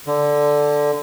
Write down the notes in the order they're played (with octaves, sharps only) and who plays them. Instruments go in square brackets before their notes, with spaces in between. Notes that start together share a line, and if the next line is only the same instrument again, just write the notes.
[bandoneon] D3